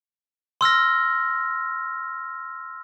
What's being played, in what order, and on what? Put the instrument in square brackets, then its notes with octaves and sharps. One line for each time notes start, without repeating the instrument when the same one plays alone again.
[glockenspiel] C6 E6 F6 A#6